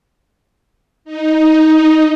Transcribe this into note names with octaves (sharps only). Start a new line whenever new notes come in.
D#4